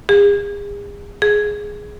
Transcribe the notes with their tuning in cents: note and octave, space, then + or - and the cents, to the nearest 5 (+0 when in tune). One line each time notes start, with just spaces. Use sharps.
G#4 -40
G#4 +0